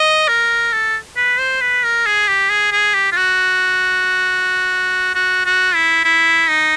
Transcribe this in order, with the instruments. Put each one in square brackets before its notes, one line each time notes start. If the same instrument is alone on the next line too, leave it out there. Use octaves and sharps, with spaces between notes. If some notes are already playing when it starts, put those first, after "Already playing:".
Already playing: [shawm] D#5
A#4
A4
B4
C5
B4
A#4
G#4
G4
G#4
G#4
G4
F4
F#4
F#4
F#4
E4
E4
D#4